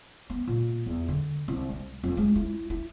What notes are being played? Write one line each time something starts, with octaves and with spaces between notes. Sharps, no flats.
B3
A#2
E2
D3
C2
G3
F2
G#3
E4
E4